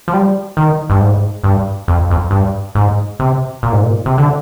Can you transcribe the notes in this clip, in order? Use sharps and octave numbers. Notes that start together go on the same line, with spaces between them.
F3
G3
D#3
G2
G#2
G2
F2
F2
G2
G#2
C3
A#2
G#2
A#2
C3
D3